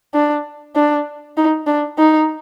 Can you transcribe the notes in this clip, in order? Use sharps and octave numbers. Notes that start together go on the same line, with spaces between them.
D4
D4
D#4
D4
D#4